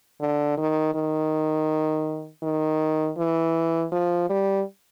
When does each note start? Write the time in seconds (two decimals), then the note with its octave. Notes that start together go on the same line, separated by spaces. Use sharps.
0.21 D3
0.58 D#3
0.95 D#3
2.43 D#3
3.18 E3
3.92 F3
4.29 G3